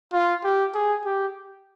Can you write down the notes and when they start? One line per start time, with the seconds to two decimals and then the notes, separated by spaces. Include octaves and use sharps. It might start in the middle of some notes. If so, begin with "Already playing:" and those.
0.13 F4
0.44 G4
0.74 G#4
1.05 G4